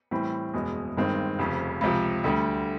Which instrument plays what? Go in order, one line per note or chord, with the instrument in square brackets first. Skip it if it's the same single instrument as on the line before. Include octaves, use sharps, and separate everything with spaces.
[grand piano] A2 E3 G3 C4
F#1 E2 B2 G#3
G1 G2 D#3 G#3 C4
F1 F2 C#3
C#2 C3 F3
D2 D3 G3